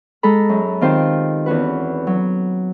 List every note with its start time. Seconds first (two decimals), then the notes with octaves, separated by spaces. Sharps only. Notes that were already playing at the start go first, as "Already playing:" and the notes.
0.23 G#3 A4 A#5 B5
0.49 F#2
0.81 D#3 C4 F4 G4 C5
1.46 E2 C#4 F#4 B4
2.07 F#3